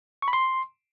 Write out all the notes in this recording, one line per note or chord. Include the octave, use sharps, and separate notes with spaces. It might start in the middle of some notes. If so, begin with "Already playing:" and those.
C#6
B5
C6